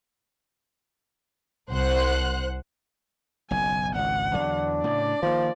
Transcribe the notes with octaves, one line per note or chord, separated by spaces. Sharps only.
C2 C5 F#5 F#6
F#1 B1 G#5
G#1 C#2 F#5
E2 D3 F#3 D4
A2 C#3 D5
D#3 F3 A#3